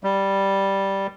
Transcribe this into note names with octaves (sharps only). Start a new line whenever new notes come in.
G3